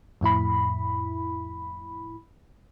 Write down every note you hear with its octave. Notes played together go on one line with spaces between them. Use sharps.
F2 A2 E4 B5